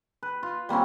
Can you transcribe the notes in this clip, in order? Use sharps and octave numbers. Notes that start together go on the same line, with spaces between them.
B4
F4
G3 A#3 C4 C#4